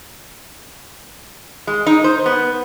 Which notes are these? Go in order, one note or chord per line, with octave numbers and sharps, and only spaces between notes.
G#3
D#4
C5
B3